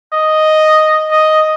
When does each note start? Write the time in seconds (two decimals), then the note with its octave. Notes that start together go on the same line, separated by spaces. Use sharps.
0.13 D#5
1.11 D#5